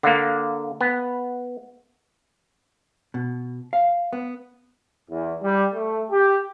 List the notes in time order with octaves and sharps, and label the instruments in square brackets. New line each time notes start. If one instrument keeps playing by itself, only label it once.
[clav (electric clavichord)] D3 A#3 [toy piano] F5 F#5
[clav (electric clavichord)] B3
[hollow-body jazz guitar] B2
F5
B3
[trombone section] E2
G3
A3
G4